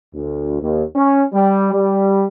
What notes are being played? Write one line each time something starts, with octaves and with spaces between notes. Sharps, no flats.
D2
D#2
C#4
G3
G3